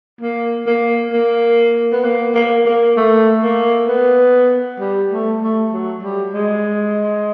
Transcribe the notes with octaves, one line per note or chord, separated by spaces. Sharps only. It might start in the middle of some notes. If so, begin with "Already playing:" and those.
A#3
A#3
A#3
B3
A#3
A#3
A#3
A3
A#3
B3
G3
A3
A3
F#3
G3
G#3